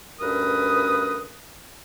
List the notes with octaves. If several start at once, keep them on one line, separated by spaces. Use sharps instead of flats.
D2 G2 C#4 A#4 B4 D#6